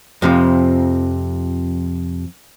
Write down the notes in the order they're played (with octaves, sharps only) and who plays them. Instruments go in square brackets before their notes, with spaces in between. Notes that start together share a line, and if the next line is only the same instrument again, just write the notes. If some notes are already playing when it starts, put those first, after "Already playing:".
[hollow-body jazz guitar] F2 C3 F3